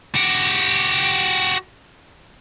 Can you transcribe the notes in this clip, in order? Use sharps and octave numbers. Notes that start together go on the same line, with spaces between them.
F#4 G4